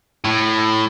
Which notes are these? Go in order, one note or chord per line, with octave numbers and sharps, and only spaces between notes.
A2